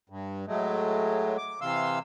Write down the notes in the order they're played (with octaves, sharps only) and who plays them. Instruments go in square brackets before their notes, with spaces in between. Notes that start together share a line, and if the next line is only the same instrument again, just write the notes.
[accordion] G2
A2 F#3 G#3 A3
D6
C3 E3 F5 C6 E6